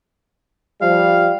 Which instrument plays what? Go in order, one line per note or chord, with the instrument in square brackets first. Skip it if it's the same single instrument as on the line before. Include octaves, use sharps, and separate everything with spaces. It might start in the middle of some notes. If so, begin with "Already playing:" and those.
[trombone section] F3 G3 [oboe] F5